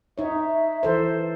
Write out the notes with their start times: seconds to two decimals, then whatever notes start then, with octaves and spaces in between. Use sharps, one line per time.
0.18 D#4 C#5 E5
0.83 E3 A4 C5